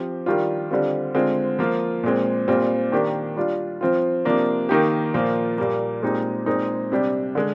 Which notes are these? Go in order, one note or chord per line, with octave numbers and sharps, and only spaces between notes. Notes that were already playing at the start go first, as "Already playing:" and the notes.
Already playing: F3 C4 G4
D#3 G3 D4 F4
D3 G3 C4 F4
D3 G#3 C4 F4
F3 A#3 F4
A#2 G#3 C4
A#2 G3 C4 F4
D#3 A#3 D4 G4
G3 D4 F4
F3 C4 F4
C3 F3 A#3 D4
D#3 A#3 D#4 G4
A#2 F3 A#3 F4
A#2 G3 A#3
A#2 G#3 C4 D#4 G4
A#2 G#3 C4 D#4
C3 G3 D4 G4
D3 G#3